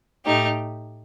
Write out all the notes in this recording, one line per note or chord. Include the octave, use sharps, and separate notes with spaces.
A2 A3 D#4 G4